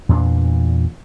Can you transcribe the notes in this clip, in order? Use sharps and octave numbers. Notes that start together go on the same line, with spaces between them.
E2 A#2 C#4 D4